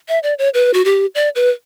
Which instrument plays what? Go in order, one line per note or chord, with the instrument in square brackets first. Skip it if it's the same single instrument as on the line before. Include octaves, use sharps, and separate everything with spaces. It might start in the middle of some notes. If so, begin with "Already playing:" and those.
[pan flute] E5
D5
C#5
B4
F#4
G4
D5
B4